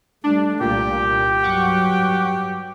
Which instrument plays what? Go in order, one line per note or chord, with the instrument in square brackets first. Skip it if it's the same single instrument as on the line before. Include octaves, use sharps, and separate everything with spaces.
[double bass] G3 A3 [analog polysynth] D4
[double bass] C2 [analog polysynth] A#2 [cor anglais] G4
[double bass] G2 F#3 [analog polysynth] F#5 C#6 D6